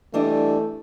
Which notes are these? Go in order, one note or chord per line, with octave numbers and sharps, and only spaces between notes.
E3 G3 A3 D4 D#5